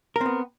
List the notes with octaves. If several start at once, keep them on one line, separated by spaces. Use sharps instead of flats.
B3 C4 A#4